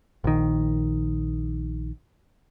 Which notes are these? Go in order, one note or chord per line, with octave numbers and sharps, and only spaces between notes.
A#1 D#3